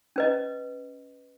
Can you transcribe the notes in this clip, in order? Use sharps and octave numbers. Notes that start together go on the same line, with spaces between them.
C#4 B4 D#5